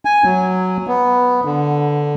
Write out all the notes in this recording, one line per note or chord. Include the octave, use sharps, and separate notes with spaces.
G#5
F#3
B3
D3